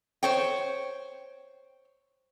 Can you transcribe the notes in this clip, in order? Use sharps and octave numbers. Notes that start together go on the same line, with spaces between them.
C5 C#5 G5